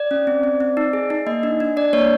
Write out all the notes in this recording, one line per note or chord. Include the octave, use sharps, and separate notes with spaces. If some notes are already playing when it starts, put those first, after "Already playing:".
Already playing: D5
C#4
C4
C4
C4
D#4
G#4
D#4
A#3 D#5
D4
D4
D4 D5
A#3 C#5